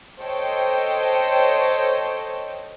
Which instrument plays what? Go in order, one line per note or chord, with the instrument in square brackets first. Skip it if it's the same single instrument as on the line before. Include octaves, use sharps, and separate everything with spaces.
[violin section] A4 C5 C#5 D#5 G5